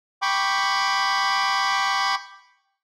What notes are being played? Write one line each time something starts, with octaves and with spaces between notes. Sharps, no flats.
G5 B5 C#6 D6